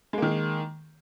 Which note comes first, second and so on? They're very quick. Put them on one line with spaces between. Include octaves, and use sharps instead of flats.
G#3 A#3 D#3